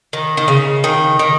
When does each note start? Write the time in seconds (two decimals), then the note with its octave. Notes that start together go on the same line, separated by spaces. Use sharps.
0.13 D#3
0.37 D#3
0.48 C#3
0.84 D#3
1.19 D#3